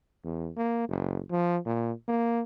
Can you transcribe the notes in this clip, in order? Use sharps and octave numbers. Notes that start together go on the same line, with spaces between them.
E2
A#3
F#1
F3
A#2
A#3